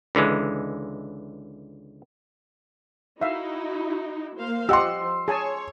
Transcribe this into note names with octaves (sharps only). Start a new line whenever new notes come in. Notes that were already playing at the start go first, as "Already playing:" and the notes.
C#2 D3 E3 G#3
D#4 E4 F#4 E5 F5
A#3 C5 F5
F3 G4 D#5 F#5 C6 E6
G#4 C#5 G#5 A5